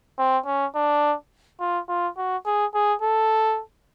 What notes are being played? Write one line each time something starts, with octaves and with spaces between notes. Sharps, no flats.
C4
C#4
D4
F4
F4
F#4
G#4
G#4
A4